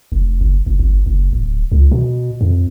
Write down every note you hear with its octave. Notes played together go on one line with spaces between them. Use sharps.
F1
F#1
F#1
G1
F#1
D1
C#2
B2
F2